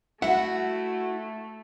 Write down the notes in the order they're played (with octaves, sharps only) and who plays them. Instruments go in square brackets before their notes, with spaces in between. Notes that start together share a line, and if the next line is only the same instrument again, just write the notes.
[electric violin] A3 [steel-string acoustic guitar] E4 F#4 [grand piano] E5 [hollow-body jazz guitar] F#5